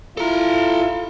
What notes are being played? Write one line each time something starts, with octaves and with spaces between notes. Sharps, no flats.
E4 F4 A4 A#5